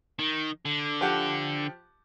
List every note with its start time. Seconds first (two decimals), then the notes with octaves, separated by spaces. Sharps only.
0.19 D#3
0.65 D3
1.01 F3 G4 F#5